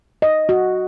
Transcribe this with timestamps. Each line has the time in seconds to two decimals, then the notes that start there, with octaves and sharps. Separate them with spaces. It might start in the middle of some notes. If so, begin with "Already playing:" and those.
0.22 D#5
0.49 F#4